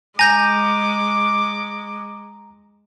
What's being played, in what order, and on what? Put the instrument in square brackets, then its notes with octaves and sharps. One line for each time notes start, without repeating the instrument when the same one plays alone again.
[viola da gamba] G#3 [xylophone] G#5 G6 A#6 [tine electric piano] A#5 [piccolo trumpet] D6